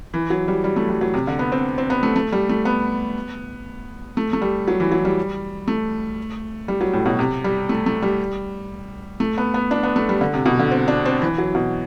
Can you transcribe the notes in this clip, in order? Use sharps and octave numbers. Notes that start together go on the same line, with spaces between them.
E3
F#3
G3
G3
A3
G3
F#3
C3
D3
B3
C4
C4
B3
A3
A3
G3
A3
B3
A3
A3
G3
F#3
E3
F#3
G3
A3
G3
F#3
A2
B2
C3
G3
A3
A3
G3
A3
B3
B3
D4
B3
A3
G3
D3
C3
B2
D3
C4
D4
C4
E3
F#3
B2